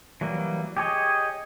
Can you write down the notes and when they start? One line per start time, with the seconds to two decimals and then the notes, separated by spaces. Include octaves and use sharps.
0.21 E3 F#3 G3 A#3
0.77 G4 G#4 C#5 D#5